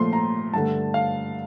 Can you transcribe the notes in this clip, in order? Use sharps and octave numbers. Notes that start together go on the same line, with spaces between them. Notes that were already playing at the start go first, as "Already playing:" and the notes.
Already playing: A#2 F3 A3 C6
A#5
G2 D3 A3 A5
F5